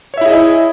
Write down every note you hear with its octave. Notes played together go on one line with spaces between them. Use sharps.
E4 G#4 C#5 D#5 E5